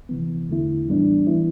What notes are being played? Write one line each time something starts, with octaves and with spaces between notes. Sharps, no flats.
C3 E3 B3
E2 D3 A3 E4
A2 E3 G3 B3 D4
E3 B3 E4